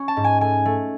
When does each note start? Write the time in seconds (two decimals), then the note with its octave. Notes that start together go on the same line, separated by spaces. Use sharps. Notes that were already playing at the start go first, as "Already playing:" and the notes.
Already playing: C#4
0.08 A5
0.17 G#2
0.24 G#5
0.41 A3 G#5
0.65 A3